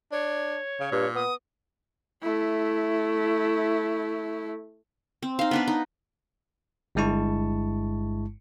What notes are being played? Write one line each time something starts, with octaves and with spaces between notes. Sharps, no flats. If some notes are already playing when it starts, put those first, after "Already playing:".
D4 C#5
C#3
G2 A#2
B3 D#6
A3 E4
C4
D#4 F5
B3 D4 B4
D#4
G1 G2 G#3 E4 A5 C#6